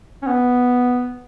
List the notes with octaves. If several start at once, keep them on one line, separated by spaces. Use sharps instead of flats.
C#4
B3